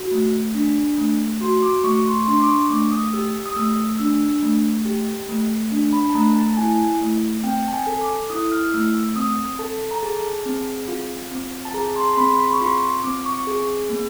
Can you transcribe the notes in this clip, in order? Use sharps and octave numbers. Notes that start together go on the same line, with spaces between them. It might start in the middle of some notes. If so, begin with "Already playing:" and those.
Already playing: F#4
A3
D4
A3
F#4 C6
D6
A3 C#6
C6
D4 C6
D6
C#6
A3 D6
D#6
G4 E6
D#6
A3 E6
D4 E6
A3
G4
A3
D4
B5
A5
A3 A#5
A5
E4 G#5
A3
C4 G5
A5
G#5
A4
D6
E4 D#6
F6
A3 E6
E6
C4 D#6
A4 A5
A#5
G#4 A5
C4
F4
C4
A5
G#4 A#5
C6
C6
C4 B5
B5
C#6
F4 C6
C4 D6
C#6
G#4
A#3